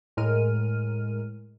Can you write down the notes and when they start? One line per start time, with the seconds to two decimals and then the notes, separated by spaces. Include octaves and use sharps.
0.17 A2 G#3 A#4 F6 D#7